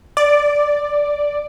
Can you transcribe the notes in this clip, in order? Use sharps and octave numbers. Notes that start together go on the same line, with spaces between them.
D5